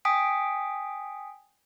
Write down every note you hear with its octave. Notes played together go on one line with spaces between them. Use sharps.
G5 G#5 D#6 B6 D7